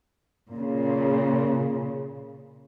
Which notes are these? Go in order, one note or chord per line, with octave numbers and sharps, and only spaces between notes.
A#2 C#3